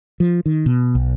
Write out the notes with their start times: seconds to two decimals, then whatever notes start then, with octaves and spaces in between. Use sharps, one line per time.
0.20 F3
0.46 D#3
0.66 B2
0.95 B1